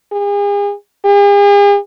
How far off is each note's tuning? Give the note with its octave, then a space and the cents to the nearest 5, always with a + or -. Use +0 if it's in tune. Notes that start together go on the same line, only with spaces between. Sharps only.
G#4 -40
G#4 -45